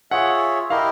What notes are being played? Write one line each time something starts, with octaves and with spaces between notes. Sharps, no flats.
F4 G#4 C#5 E5 F#5
E4 G4 A#4 D#5 F5